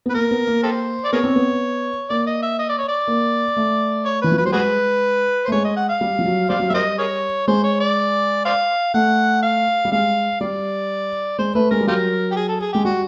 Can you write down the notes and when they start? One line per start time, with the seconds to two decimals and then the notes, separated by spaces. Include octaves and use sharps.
0.06 B3
0.10 B4
0.14 A#3 A#4
0.31 B3
0.47 A#3
0.64 G4 A4 C5
1.05 D5
1.13 B3 G#4 A#4 C#5
1.24 C4
1.36 B3
2.10 A#3 D5
2.27 D#5
2.43 E5
2.59 D#5
2.69 D5
2.78 C#5
2.89 D5
3.08 A#3
3.56 A3
4.05 C#5
4.22 E3 B4
4.32 F3
4.38 F#3 B4
4.46 G3 C5
4.53 G#3 F#4 G#4 B4
5.45 C5
5.48 A3
5.52 G#3 C#5
5.64 D#5
5.77 F#5
5.89 F5
6.01 G3
6.19 F3
6.25 F#3
6.49 G3 C5 D5 F5
6.60 F#3
6.70 G3 A#4 C5 D#5 E5
6.99 G#4 A#4 C#5
7.48 G#3 C5
7.64 C#5
7.80 D5
8.45 C5 D5 F5
8.94 A3 F#5
9.43 F5
9.85 G3
9.92 G#3 F5
10.41 G3 D5
11.38 G#3 C5
11.55 A3 B4
11.71 G#3 A#4
11.81 G3
11.87 F#3 F4 G4 A#4
12.31 G4
12.36 G#4
12.48 A4
12.61 G#4
12.73 G#3 G4
12.85 G3 F#4